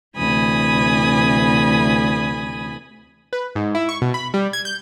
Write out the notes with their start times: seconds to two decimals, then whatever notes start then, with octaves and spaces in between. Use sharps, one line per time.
0.17 D2 C3 E3 G#5 B5 D#6
3.33 B4
3.55 G#2
3.75 E4
3.89 C#6
4.02 B2
4.14 B5
4.34 G3
4.53 G#6
4.65 G6